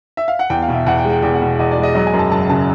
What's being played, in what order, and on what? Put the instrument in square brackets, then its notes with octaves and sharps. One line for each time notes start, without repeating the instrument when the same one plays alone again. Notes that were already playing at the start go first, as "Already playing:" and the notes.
[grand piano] E5
F5
F#5
E2 G5
F5
B2
E5
E2 F#5
G5
G#3
G5
E2 G5
F#5
B2
E2 D#5
D5
G#3
D#5
F#3 D#5
G#5
F#2
A5
F#1 A5
C#3 A5